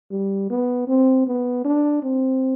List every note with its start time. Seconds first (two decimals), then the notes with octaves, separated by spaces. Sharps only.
0.11 G3
0.50 B3
0.88 C4
1.27 B3
1.65 D4
2.03 C4